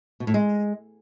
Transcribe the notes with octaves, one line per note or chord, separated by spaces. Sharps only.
B2
A2
G#3